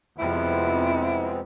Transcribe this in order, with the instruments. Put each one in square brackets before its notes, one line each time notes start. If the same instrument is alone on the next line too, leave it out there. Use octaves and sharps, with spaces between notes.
[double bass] F2 [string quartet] C3 F3 G3 [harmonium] G#3 B3 C4 [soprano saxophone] E4